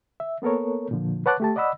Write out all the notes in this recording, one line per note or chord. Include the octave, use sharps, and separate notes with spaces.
E5
A#3 B3 A4 A#4 C#5
A#2 D3 F3
B4 C#5 F#5 A5 D6 F#6
A3 G4 A5
D5 D#5 F#5 B5 E6